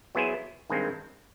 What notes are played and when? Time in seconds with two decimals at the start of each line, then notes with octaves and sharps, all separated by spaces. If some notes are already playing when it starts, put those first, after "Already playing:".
0.15 F#3 B3 E4 G#4 C5
0.70 G2 D#3 G#3 C4